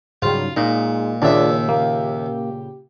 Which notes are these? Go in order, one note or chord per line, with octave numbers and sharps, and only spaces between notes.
G#2 C#3 F#3 G3 F4
A#2 G#3 D#4
D#2 A#2 C#3 D4 F4 D5 E5
A#3 G4